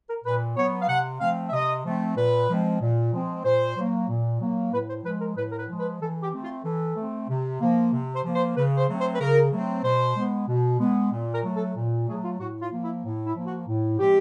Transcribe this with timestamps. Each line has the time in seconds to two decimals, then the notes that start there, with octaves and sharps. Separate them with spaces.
0.08 A#4
0.24 A#2 B4
0.57 F#3 B3 C#5
0.81 F5
0.88 C3 F#5
1.20 F3 A3 C4 F5
1.47 E5
1.52 C3 D#5
1.85 F3 A3 C4
2.16 A#2 B4
2.48 F3 G#3 C4
2.80 A#2
3.12 F3 G#3 C4
3.44 A#2 C5
3.76 F#3 A#3
4.08 A#2
4.40 F#3 A#3
4.72 A2 B4
4.89 C5
5.04 F3 G#3 B4
5.20 A#4
5.36 A2 B4
5.51 A#4
5.57 B4
5.68 F3 G#3
5.79 B4
6.00 E3 A4
6.21 G4
6.32 A3 C4
6.43 F4
6.64 E3 A4
6.96 A3 C4
7.28 C3
7.60 F3 A#3
7.92 C3
8.14 C5
8.23 F3 A#3
8.35 C5
8.56 C#3 B4
8.77 C5
8.88 F#3 A3 C4
8.98 C5
9.12 B4
9.19 C#3 A#4
9.52 F#3 A3 C4
9.83 B2 C5
10.16 G#3 B3
10.48 B2
10.80 G#3 B3
11.12 A#2
11.33 A#4
11.44 F#3 A3
11.55 A4
11.76 A#2
12.08 F#3 A3 G#4
12.24 F4
12.39 A2 F#4
12.60 F4
12.72 F3 A#3
12.82 E4
13.03 A2
13.25 E4
13.35 F3 A#3
13.46 F#4
13.67 A2
13.99 F3 G#3 C4 G4